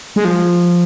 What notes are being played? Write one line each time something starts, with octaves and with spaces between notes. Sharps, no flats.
G#3
F3